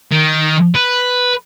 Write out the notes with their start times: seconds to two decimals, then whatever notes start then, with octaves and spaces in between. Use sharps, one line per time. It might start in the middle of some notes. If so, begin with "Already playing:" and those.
0.12 D#3
0.75 B4